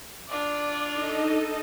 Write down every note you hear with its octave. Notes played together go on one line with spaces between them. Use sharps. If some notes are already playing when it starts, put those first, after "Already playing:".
D4 F4 D5
D#4 A4 D#5